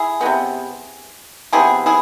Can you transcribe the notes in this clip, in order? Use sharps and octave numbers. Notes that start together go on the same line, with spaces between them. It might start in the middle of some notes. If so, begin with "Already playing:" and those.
Already playing: E4 G#4
C3 G#3 B3
C3 F3 B3 E4 G#4
E4 G#4